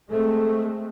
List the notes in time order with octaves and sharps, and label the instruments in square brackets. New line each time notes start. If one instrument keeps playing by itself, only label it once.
[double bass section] G#3 A3 C4 [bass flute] A4